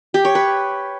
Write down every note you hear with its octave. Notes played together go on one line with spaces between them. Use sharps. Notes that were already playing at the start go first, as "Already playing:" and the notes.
G4
C#5
B4